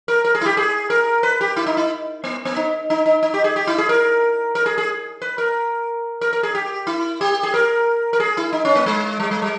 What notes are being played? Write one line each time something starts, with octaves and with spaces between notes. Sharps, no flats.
A#4
A#4
G#4
E4
G4
G#4
A#4
B4
G4
E4
D#4
E4
B3
B3
D#4
D#4
D#4
D#4
G4
G#4
G4
E4
G#4
A#4
A#4
G#4
G#4
B4
A#4
A#4
A#4
G#4
G4
E4
G4
G#4
A#4
A#4
G#4
E4
D#4
C#4
A#3
G#3
G3
G#3
G3